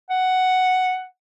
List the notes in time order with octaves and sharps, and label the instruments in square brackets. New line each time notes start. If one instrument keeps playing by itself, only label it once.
[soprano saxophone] F#5